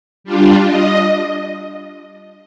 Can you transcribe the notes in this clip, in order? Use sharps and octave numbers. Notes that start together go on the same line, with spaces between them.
G3 D4 F4
D#5